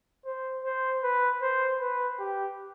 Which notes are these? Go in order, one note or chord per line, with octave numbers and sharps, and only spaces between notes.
C5
C5
B4
C5
B4
G4